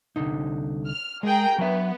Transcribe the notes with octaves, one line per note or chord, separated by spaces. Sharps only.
C2 D3 D#4
F6
G#3 G#4 A#4 G5
F#3 B3 E5